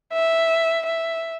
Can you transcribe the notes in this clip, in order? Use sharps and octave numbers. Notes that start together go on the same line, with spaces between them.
E5
E5